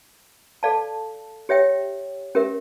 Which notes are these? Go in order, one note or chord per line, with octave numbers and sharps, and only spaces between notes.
A4 D5 F5 A5
G4 C#5 E5 G5
C#4 G4 A#4 E5